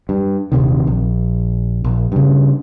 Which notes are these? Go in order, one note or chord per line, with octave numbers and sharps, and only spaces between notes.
G2
D#1 C3 D#3
A#1
A#1
G2 C#3